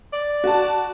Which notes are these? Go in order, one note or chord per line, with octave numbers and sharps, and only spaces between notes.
D5
F#4 A5